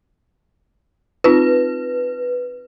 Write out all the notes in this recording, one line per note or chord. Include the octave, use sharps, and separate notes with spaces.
C4 D#4 F4 B4